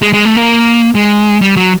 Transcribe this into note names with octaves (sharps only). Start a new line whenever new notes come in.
G#3
G#3
A3
A#3
G#3
G3
F#3